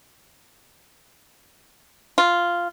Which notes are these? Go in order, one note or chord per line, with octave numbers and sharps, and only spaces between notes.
F4